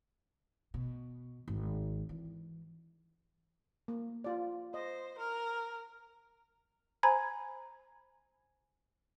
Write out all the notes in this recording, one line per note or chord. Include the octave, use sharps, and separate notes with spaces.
B2
G#1
E3
A#3
F4 D5
C5 D#5
A#4 F6
C5 G#5 A#5 B5 G#6